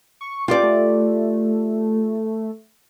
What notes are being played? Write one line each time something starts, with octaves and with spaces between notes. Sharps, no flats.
C#6
F4 G4 D5 G5
A3